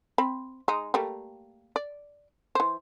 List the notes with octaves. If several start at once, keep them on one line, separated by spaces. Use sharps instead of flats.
C4 B5
G#3 D#4
G3 A3 A#3
D5
E3 C5